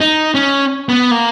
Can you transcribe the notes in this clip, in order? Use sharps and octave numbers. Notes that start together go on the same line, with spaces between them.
D#4
C#4
B3
A#3